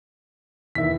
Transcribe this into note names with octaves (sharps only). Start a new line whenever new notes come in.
E2 D#3 E5 B6